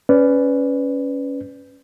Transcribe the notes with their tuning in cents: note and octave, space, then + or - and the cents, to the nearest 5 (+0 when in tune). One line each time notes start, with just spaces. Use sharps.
C#4 +5 B4 +10 D5 -5